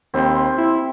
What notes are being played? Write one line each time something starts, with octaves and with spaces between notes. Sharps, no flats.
D#2 C4 B5 C6
E4